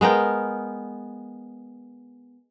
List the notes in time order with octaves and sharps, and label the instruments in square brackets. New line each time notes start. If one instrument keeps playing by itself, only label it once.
[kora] G#3 B3 A#4 G5